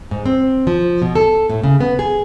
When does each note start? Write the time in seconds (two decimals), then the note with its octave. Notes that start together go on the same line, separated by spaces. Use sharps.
0.11 G#2
0.26 C4
0.67 F3
1.02 B2
1.15 A4
1.50 A2
1.64 C#3
1.81 B3
1.99 G#4